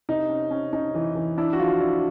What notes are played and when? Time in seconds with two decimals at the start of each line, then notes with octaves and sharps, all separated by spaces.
0.09 C3 D#4
0.30 C#4
0.51 C#4
0.73 C#4 D#4
0.95 E3
1.15 E3
1.38 D4 E4
1.53 F#4
1.59 F3 F4
1.80 D4 E4